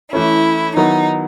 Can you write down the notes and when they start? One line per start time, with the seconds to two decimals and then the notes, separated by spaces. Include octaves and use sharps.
0.12 E3 A3 C#4 E4
0.76 D#3 F#3 B3 D#4 E4